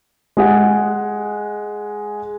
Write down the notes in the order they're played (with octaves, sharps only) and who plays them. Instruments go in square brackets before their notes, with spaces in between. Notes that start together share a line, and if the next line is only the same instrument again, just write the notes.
[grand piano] G#3 G#4 F#5